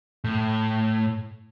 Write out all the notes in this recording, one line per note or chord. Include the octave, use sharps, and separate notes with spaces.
A2